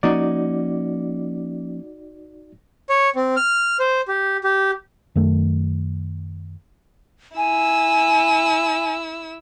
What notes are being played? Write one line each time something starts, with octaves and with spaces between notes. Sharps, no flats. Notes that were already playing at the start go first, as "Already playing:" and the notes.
F3 A#3 C#4 D#4 F#4 D5
C#5
C4
F6
C5
G4
G4
F#2 D#3 A3
E4 G#5 E6